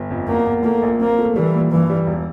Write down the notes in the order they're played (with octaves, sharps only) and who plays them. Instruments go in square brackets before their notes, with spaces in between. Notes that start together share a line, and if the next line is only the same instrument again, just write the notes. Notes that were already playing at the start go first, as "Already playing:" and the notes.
Already playing: [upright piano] G1
F2
[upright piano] E2 [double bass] A#3
[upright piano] E2
[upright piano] A3 [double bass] A#3
[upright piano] A#1
[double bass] A#3 [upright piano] C4
[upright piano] A3
[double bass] E3 [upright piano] G3
[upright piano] A#2
[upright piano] G2 [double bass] E3
[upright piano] G3
E1